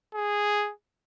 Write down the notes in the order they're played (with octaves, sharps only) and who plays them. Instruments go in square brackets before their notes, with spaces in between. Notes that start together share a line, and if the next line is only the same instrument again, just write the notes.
[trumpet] G#4